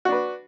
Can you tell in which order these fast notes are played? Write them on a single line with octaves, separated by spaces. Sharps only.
F#4 D4 B4